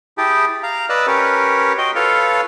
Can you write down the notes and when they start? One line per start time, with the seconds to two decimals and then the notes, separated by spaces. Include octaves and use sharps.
0.18 E4 G4 G#4 G5 A5
0.63 F5 A#5
0.89 B4 D5 D#5 E6 F#6
1.07 C#4 G4 A#4 B4 C#5
1.78 F#4 D#5 G5 C6
1.95 F4 A4 B4 C#5 F5 A5